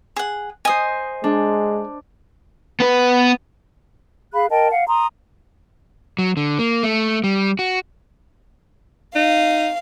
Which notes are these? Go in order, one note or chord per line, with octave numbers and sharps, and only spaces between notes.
G#4 F#5
C5 D#5 G#5 D#6
G#3 D4
B3 B4
G#4 F5 B5 F#6
A#4 D#5 G5 A5
F5 F#5
A#5 C6 D#6
F#3
D3
A#3
A3
G3
F#4
D#4 F5